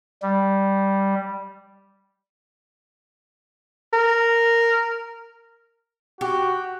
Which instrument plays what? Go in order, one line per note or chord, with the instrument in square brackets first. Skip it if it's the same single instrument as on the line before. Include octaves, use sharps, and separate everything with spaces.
[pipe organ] G3
[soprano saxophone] A#4
[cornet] F#4 [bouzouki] G4